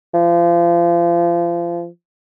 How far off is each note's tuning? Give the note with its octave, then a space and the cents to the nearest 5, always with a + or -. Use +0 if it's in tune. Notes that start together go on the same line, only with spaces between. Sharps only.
F3 -30